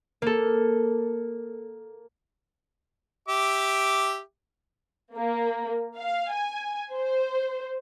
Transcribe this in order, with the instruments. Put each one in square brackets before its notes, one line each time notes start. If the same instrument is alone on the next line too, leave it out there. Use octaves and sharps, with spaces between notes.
[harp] A#3 A4
[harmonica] G4 E5 D6
[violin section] A#3
F5
G#5
C5